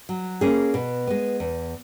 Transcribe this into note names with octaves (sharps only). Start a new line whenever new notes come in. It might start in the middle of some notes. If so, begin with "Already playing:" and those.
F#3
A#3 C#4 G#4
B2
G#3 B3
E2